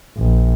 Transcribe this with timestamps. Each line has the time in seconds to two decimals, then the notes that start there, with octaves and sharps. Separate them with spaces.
0.18 A#1